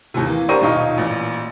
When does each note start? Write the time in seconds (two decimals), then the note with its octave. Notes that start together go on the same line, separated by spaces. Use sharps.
0.14 D#2 A2 C3
0.26 E3 A#3
0.49 D4 G4 A#4 C5 C#6 D#7
0.61 D#1 B1 D#4 F4 C#6
0.98 A1 A#2